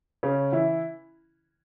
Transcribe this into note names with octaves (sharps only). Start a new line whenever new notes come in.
C#3 C#4
E3 E4